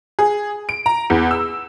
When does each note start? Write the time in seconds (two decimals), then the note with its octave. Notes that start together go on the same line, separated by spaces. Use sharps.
0.19 G#4
0.69 D7
0.86 A#5
1.10 E2
1.31 E6